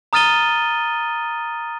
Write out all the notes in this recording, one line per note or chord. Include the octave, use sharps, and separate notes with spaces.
A#5 D#6 F6 A6 D#7 G7